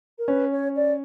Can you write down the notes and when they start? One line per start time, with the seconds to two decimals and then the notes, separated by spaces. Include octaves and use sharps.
0.18 A#4
0.28 C#4 B4
0.51 C#5
0.76 D5